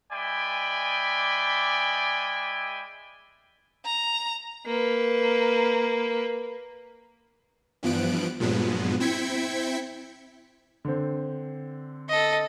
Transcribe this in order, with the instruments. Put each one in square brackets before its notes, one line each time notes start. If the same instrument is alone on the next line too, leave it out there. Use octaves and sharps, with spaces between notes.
[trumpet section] G#3 D5 E5 G5 G#5 B5
[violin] A#5
[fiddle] A#3 B4
[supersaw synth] G2 E3 F3 B3 F#6 D7
G2 A#2 F3 F#3 G#3 B3
C4 E4 G5 G#6 B6 C#7
[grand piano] D3 C4
[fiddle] A4 D#5